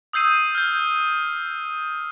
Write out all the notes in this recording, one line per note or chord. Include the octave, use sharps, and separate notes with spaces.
D#6 E6 G6 C7 D#7
F6 G6